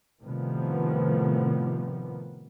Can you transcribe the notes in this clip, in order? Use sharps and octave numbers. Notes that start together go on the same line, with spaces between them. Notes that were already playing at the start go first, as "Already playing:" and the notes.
A2 C3 D#3 F3 G3 B3